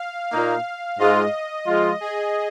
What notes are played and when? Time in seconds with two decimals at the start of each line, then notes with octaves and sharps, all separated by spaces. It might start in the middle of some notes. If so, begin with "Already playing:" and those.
Already playing: F5
0.30 A#2 A#3 D#4 F5
0.98 G#2 G#3 F4 D#5
1.66 F3 G#3 F4
2.01 G#4